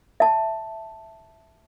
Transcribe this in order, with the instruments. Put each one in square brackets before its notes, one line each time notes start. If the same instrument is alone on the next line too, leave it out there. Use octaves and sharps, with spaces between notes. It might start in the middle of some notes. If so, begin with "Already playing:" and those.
[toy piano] E5 A5